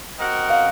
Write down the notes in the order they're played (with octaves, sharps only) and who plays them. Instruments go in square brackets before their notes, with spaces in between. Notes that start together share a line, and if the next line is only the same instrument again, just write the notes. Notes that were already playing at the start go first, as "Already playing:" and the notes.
[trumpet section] C4 F#4 A#4 D#5 F#5
[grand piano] F5